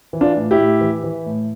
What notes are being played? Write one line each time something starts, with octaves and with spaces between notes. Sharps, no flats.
E3
D4 F4
A2
E4 G4
A2
E3
E3
A2